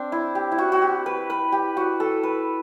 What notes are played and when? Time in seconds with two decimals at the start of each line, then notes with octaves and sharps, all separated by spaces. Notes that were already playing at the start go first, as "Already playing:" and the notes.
Already playing: C4 D4
0.12 E4
0.35 G4
0.52 E4
0.58 F#4
0.72 F#4
0.82 G4
1.06 B4
1.30 B4
1.52 G4
1.77 F#4
2.00 A4
2.23 B4